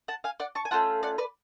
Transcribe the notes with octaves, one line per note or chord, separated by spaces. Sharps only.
F#5 A5
F5 G#5
D5 F#5
A5 C#6
G#5
A3 C#4 F4 F#5 A5
D5 F#5
B4 D5